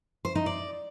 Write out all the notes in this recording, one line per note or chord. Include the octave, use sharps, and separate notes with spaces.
C5
D#4
D5